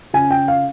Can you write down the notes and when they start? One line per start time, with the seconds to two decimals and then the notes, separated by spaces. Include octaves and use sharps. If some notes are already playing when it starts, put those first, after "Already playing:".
0.14 C#3 G#5
0.31 G5
0.48 F5